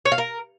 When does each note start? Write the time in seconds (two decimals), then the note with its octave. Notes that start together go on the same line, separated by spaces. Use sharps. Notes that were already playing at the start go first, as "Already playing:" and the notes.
0.05 C#5
0.12 F5
0.18 A#4